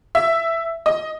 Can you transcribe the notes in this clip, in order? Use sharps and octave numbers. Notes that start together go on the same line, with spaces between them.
E5
D#5